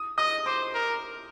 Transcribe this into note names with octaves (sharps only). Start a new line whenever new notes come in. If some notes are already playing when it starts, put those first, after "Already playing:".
Already playing: D#6
D#5 D#6
C5 D6
A#4